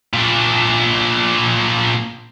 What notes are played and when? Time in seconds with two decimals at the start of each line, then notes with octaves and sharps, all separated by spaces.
0.14 A#2 D4